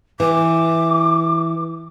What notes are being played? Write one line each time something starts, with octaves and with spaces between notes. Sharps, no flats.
E3 D6